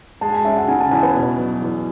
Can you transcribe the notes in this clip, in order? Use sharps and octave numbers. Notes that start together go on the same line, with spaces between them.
G#3 A5
G#5
C#4 E5
F#5
C#3 G#5
A5
E2 G#5
B4
B2
F#3
E2